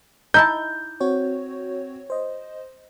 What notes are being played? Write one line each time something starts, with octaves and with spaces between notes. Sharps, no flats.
D#4 E4 A5 G6
C4 F#4 C#5
C5 D#5